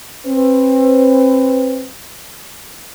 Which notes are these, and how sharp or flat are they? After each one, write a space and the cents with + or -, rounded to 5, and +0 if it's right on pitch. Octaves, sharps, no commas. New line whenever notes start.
C4 +30 B4 +25